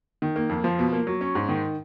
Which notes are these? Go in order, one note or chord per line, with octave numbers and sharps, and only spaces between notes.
D#3
A#3
F2
F3
B2
A#3
F#3
C#4
G#2
D#3